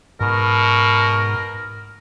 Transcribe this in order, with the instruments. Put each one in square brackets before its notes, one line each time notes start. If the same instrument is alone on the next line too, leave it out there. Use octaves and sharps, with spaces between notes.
[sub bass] G#2 [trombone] B2 [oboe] A#4